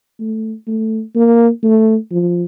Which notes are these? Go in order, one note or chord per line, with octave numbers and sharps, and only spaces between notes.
A3
A3
A#3
A3
F3